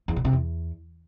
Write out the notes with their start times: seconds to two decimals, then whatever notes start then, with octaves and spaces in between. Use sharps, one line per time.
0.08 E2
0.16 B2
0.25 C3
0.33 E2